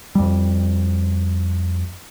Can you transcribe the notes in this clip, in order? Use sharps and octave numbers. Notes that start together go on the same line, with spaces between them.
F2 G3